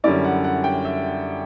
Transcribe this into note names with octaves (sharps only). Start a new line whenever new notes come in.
F#2 D3 G3 C#4 E4 D5
F#5
F#5
G5
E5